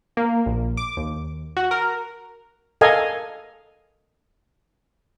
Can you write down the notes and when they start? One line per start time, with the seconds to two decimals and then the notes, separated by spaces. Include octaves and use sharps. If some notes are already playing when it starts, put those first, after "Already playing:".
0.17 A#3
0.46 A#1
0.77 D6
0.97 D#2
1.57 F#4
1.71 A#4
2.81 A4 A#4 D#5 F5 G#5